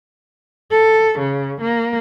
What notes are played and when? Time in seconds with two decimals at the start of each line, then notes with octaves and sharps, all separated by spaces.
0.71 A4
1.19 C#3
1.61 A#3